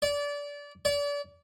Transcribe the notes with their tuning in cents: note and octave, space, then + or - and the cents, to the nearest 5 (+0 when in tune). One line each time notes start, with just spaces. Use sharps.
D5 -25
D5 -35